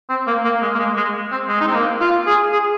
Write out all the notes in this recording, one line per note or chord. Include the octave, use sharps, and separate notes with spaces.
C4
A#3
A#3
G#3
A#3
G#3
G#3
C4
G#3
D#4
C4
A#3
F4
G#4
G#4